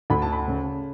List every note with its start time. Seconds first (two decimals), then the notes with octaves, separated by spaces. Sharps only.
0.10 D2 B5
0.22 A5
0.32 B5
0.48 C#3